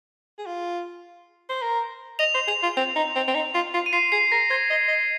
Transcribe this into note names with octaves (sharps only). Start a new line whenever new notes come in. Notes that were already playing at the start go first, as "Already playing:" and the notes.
G#4
F4
C5
A#4
D#5 F7
C5
G#4 F7
F4
C4 F7
D#4
C4
C4
D#4
F4
F4
D#7
F4 C7
G#4 C7
A#4 A#6
C5 G#6
D#5
D#5